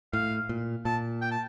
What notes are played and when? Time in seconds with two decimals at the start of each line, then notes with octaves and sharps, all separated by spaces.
0.13 A2 F5
0.49 A#2
0.85 A#2 A5
1.22 G5
1.31 A5